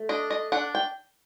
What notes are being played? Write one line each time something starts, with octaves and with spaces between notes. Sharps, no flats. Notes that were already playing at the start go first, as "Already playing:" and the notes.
Already playing: A3
D4 D#5
D#5
D4 F#5
G5